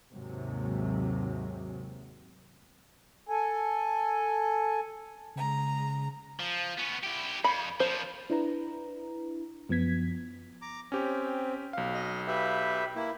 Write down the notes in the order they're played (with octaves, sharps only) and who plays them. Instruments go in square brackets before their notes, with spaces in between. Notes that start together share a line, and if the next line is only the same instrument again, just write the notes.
[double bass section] D#2 G#2 C3 F#3
[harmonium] A4 G#5
[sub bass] C#3 [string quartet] G#3 A#5
[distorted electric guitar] F3
B3 C#4
E4 G4
[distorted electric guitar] F2 [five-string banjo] B5
[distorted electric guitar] A#2 F3 [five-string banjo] C5
[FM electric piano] D4 E4 B4 A#5
F#2 F3 B3 G#6 B6
[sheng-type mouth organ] A#5 D6
[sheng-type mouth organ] C4 [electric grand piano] C#4 G4
[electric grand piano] B1 F5
[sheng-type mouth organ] D#5
G4 B4 E5
A#3 E4